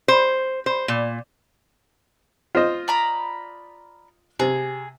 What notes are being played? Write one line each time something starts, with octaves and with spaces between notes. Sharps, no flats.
C5
C5
A#2
F4 C5 D#5
D5 A#5 B5
C3 G#4